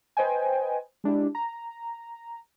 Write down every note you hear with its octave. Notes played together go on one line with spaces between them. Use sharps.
B4 C5 D#5 G5 G#5
G#3 D4 E4 G4
A#5